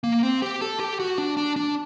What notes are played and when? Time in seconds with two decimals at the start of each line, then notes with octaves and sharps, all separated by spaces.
0.04 A#3
0.23 C4
0.42 G4
0.61 A4
0.80 G4
1.00 F#4
1.18 D4
1.37 D4
1.56 D4